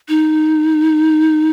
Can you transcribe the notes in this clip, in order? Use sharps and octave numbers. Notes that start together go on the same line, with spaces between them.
D#4